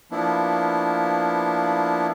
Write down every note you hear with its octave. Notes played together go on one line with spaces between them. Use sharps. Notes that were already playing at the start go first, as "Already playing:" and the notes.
F3 A#3 B3 D4 E4